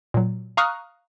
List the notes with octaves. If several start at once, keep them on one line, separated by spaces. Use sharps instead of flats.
A#2 F#3
F5 A#5 C#6 D#6 F6 F#6